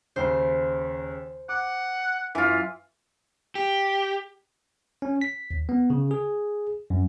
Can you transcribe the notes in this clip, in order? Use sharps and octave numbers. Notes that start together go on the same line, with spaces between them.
D#2 C#3 C5
F#5 D6
F#2 E3 F4
G4
C#4
B6
D#2
B3
C#3
G#4
F#2